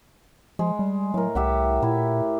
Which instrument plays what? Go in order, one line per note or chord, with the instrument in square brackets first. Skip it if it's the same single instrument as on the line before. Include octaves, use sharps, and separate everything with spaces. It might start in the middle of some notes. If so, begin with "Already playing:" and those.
[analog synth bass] F3 [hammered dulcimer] G#3
[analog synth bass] G3
[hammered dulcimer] A2 A#4 [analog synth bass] F#3
[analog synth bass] C2 [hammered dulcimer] G4 E5 F#5
[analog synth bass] A#2 [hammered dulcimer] E4